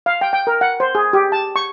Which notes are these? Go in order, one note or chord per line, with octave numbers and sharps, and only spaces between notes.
F5
G5
G5
A#4
F#5
C5
G#4
G4
A5
C#6